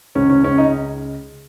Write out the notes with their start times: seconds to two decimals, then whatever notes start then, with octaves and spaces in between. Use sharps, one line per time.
0.15 C#2 C#4
0.30 C#4
0.43 C#2 C#4
0.58 D#4